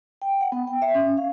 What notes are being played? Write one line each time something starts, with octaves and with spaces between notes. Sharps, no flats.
G5
F#5
B3
G5
E5
C#4
F5